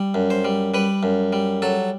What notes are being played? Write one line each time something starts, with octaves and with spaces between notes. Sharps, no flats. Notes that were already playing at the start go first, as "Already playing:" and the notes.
Already playing: G3
F#2
C5
G3
G3 B4
F#2
G3
F#3 A4